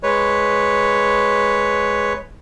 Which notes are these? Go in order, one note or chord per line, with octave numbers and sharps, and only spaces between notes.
G#3 B4 C#5